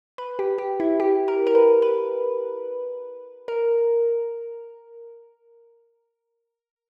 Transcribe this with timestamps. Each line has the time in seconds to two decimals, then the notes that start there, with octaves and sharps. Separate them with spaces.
0.18 B4
0.39 G4
0.58 G4
0.80 E4
1.00 G4
1.28 A#4
1.47 A#4
1.55 B4
1.82 B4
3.48 A#4